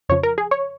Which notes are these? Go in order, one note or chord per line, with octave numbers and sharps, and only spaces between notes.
F2 C#3 F3 C#5
A#4
G#4
C#5